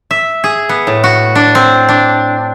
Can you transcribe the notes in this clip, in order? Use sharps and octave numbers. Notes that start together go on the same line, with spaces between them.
E5
G#4
B3
A2
F#4
D4
C4
D4